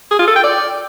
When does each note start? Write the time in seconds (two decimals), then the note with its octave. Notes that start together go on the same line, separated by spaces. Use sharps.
0.11 G#4
0.19 F4
0.28 A4
0.36 G5
0.44 D5